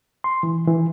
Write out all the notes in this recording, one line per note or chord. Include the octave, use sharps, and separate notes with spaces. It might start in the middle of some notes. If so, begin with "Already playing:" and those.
C6
E3
E3